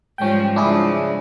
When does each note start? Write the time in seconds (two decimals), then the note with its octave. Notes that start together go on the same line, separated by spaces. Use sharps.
0.18 G#2 F3 G3 C#4 G5
0.56 C#3 F3 G#3 D4 E4 G#4